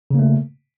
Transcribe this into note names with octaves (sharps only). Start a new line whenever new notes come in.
C#3 A3 A#3